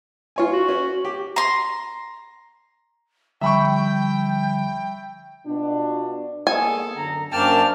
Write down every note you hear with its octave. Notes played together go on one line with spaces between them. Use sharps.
F4 C#5 G#5
F#4
C#4
G4
A#5 C6
D3 F3 G3 E5 G5 B5 C#6
B2 D4 F4
A#3 B3 G#4 A4 G#5
F#2 D3 A#5
F#2 A#3 D4 C5 D5 G5 A5 F6